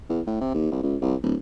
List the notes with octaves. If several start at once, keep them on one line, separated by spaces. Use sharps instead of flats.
E2
A2
C3
D#2
C2
C#2
C2
D1